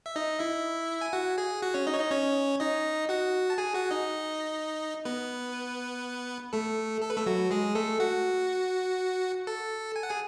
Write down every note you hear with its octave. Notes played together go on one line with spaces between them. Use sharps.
E5
D#4 D#5
E4 E5
G#5
F#4 F#5
G#4 G#5
F#4 F#5
C#4 C#5
D#4 D#5
C#5
D#4 D#5
C#4 C#5
D#4 D#5
F#4 F#5
A5
G#4 G#5
F#4 F#5
D#4 D#5
B3 B4
A3 A4
A4
B4
A3 A4
F#3 F#4
G#3 G#4
A3 A4
F#4 F#5
A4 A5
G#5
F#5
G#4 G#5